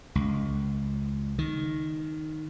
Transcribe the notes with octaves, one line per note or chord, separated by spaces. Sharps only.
C#2
D#3